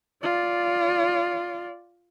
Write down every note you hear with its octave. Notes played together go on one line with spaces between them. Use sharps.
F4 D5